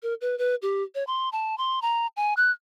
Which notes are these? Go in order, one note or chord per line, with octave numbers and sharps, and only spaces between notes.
A#4
B4
B4
G4
C#5
C6
A5
C6
A#5
G#5
F#6